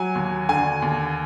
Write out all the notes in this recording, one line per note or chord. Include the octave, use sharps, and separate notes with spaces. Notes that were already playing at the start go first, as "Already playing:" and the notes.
Already playing: F#3 G#5
D#2
D3 G#5
D#2